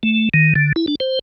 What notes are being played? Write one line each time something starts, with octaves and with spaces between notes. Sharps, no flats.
A3
D#3
D3
E4
D4
C5